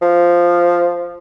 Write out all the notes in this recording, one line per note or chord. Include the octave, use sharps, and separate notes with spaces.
F3